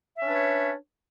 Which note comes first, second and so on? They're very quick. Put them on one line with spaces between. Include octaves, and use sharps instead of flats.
E5 C#4 D4 B4 C#5